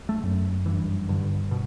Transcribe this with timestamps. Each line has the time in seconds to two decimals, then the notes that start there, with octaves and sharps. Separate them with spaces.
0.09 A3
0.23 F#2
0.66 G2 E3
1.09 G2 D3
1.51 B2